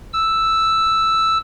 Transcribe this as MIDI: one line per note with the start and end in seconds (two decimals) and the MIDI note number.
0.13 1.38 88